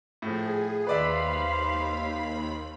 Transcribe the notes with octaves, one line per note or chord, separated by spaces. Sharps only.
A2 F3 G#4
D#2 B4 C5 D5 E5 F5 B5